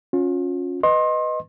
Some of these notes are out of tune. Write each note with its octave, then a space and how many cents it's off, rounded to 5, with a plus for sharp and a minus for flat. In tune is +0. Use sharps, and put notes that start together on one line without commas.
C#4 +0 F4 +40
B4 +0 D#5 -5 C6 +30